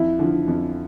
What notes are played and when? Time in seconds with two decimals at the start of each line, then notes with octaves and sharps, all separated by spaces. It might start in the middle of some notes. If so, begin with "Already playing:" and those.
Already playing: F2 E4
0.19 D3 F3
0.48 F2